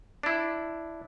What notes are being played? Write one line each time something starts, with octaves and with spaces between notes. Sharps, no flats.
D4 E4